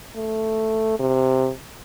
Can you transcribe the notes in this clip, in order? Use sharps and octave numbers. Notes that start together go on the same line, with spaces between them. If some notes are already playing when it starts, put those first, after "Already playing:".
A3
C3